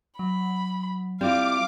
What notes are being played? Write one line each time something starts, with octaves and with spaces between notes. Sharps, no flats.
F#3 B5
G3 C4 E4 F4 F5 D6